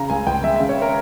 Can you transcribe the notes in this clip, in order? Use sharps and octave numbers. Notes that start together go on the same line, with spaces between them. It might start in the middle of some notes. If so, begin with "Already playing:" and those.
Already playing: C#3 A#5
C#2 G#5
C#2 G5
G#3 E5
E5
C#3
C#5
A#4